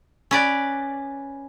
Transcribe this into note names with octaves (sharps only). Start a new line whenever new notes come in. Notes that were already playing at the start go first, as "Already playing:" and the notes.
C#4 B4 D5